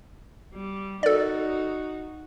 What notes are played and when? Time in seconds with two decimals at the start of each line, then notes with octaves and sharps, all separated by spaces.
0.54 G3
1.03 D#4 F#4 A4 D5